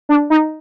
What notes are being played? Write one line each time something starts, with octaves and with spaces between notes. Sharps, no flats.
D4
D#4